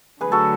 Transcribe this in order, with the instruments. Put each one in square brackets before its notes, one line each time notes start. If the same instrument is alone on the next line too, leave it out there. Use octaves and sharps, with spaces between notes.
[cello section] D3 F#3 A3 [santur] G#4 B4
[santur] F#4 A4